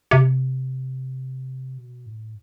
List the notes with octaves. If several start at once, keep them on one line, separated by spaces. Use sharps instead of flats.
C3
B2
A2